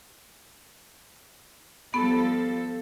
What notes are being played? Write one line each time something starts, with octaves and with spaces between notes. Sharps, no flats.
F3 G3 B3 A4